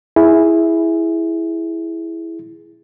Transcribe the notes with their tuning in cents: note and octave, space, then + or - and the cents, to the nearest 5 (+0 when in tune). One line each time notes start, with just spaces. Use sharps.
E4 +0 G#4 +0